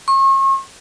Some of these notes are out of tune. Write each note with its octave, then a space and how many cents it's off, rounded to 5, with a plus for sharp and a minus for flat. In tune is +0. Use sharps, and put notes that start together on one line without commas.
C#6 -40